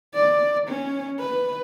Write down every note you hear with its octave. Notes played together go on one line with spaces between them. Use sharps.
D5
C#4
B4